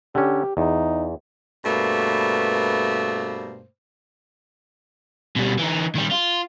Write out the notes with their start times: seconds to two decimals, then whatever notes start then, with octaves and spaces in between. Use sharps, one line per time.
0.15 D3 C#4 G4
0.57 E2 D#4
1.64 G2 B2 A3 A#3 C5
5.36 B2 G3
5.59 E3 D#4
5.95 D#3 G3
6.12 F4